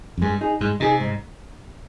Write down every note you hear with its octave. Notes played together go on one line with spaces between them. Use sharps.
F2
G2 G#3
D#4 G#4
G#2 G#3
C3 D#4 G#4
G#2